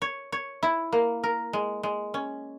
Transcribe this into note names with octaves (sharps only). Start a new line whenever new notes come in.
C#5
C#5
E4
A#3
A#4
G#3
G#3
C#4